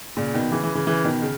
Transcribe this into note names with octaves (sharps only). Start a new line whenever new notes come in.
A#2 C#3
B2 D#3
C#3 E3
C#3 E3
C#3 E3
C#3 E3
B2 D#3
C#3